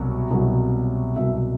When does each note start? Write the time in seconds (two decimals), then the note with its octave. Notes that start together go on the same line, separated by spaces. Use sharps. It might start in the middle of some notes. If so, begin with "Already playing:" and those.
Already playing: C2 B2 F#3
0.31 C2 B2 F#3
1.16 C2 B2 F#3 E5